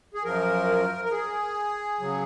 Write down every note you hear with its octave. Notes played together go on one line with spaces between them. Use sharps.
G#4
F#2 F3 A#4
A#4
G#4
C#3 F#3